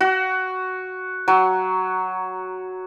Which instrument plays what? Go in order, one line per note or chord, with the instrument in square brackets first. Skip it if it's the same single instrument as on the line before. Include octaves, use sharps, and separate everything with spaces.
[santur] F#4
F#3